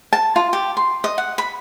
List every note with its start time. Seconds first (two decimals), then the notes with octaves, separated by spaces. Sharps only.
0.13 A5
0.36 F4
0.53 G4
0.77 C6
1.04 D#5
1.18 F#5
1.38 B5